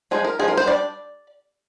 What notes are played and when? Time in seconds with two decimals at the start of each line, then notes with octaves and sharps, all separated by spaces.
0.11 F3 G#3 D#4 G#4
0.24 A#4
0.39 F3 G#3 D#4 G#4
0.48 A#4
0.57 C5
0.66 G3 D4 D5